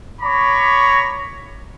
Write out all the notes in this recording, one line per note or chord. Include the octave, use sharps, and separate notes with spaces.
C#5 A#5 B5 C#6 D6